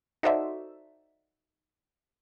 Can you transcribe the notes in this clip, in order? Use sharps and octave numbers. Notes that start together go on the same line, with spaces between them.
D#4 F#4 A4 C5 D5 E5